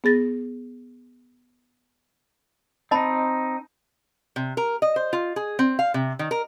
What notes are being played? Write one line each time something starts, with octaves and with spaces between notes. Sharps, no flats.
B3 G#4 A6 A#6
C4 D#4 D#5 A5 B5
C3
A#4
D#5
C5
F4
G#4
C4
F5
C3
D#3
A#4